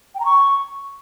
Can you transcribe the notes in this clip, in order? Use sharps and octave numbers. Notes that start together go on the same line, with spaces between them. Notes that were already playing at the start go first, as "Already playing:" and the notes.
G5
A#5
C#6